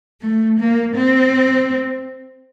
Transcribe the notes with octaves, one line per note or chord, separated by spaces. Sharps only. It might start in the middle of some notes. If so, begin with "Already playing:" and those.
A3
A#3
C4